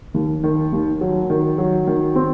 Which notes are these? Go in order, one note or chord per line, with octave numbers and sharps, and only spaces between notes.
D#2
D#3
D#2
F#3
D#3
F#3
D#3
C4